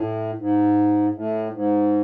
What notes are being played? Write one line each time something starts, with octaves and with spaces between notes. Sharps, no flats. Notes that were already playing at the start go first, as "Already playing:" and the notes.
Already playing: A2
G#2
A2
G#2